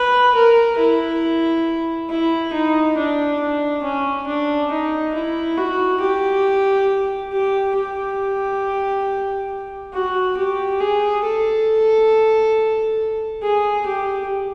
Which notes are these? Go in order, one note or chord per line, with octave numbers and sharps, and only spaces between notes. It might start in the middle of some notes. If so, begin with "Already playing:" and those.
Already playing: B4
A#4
E4
E4
D#4
D4
D4
C#4
D4
D#4
E4
F#4
G4
G4
G4
F#4
G4
G#4
A4
G#4
G4